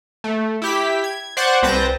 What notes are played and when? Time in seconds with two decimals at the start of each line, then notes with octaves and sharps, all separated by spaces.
0.24 A3
0.62 E4 G4 B6
1.04 G#6
1.37 C5 D5 F#5 C#6 F#6 G#6
1.62 C2 C4 B4 A5 G6 A#6